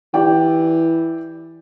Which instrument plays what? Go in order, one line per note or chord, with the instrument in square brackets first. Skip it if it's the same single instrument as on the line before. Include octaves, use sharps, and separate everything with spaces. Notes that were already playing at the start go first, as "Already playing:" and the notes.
[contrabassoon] E3 [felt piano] G4 D5 G5